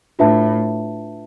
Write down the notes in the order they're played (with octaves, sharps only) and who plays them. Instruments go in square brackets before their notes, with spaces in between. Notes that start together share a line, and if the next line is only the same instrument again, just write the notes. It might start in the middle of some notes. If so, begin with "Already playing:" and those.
[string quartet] A2 [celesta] D4 F4 B4 E5 A5